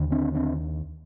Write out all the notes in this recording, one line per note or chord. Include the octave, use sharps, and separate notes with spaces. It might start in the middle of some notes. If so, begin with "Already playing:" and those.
Already playing: D#2 D3
C4 D4
C4 D4